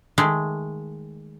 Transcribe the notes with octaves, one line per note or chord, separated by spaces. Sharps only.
D#3 G#3 A3